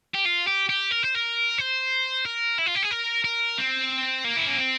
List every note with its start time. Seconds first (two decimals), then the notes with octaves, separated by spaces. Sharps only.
0.15 G4
0.26 F4
0.47 G4
0.69 G4
0.91 A#4
1.04 C5
1.15 A#4
1.58 C5
2.25 A#4
2.58 E4
2.66 F4
2.75 G4
2.83 G#4
2.91 A#4
3.24 A#4
3.58 C4
4.25 A#3
4.37 E4
4.47 C#4
4.57 C4